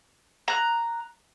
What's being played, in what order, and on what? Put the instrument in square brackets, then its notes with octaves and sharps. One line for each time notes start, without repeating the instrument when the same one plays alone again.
[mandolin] A#5 F#6